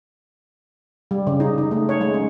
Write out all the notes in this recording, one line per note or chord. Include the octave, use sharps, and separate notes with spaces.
G3
C#3
D#4
D#4
A3
C#5
G#3
C#4